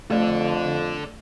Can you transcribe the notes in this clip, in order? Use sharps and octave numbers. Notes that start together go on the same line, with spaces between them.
F2 A3 A4 D5